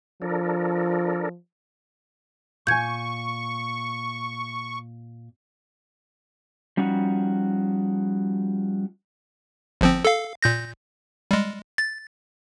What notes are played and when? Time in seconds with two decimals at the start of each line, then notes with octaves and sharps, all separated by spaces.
0.22 F3 D4 A4 A#4
2.67 A#2 G#5 C#6 G6 G#6
6.77 F3 G3 C#4 D#4 F#4
9.81 G1 F3 C4
10.05 A4 F5
10.42 A#2 G6 A#6
11.31 G3 G#3
11.78 A6